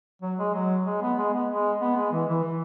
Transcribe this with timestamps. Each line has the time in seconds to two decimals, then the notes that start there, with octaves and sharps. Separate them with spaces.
0.22 F#3
0.39 G#3
0.54 F#3
0.86 G#3
1.01 B3
1.18 G#3
1.33 B3
1.50 G#3
1.81 B3
1.97 G#3
2.12 E3
2.29 E3
2.44 E3